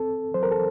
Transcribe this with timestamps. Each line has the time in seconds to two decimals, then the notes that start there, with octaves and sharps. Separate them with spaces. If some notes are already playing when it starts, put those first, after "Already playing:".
Already playing: C4 A4
0.34 F#3 C5
0.43 A#4
0.51 A4